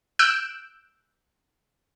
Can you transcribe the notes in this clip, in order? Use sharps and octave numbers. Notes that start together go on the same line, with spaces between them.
E6 F#6 G6 D7 E7